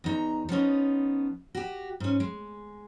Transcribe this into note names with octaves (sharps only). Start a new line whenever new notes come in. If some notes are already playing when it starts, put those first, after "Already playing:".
E2 D#4 A#5
F3 B3 C#4 D#4
F#4 G4
G#2 C#4
G#3